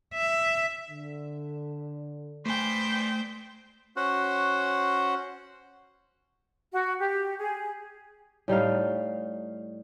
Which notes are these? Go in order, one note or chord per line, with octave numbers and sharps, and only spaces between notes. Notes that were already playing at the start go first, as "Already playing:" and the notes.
E5
D3
A3 B4 C5 D5 G5 G#5
C#4 F#4 C5 F#5
F#4
G4
G#4
A2 G3 D#4 F5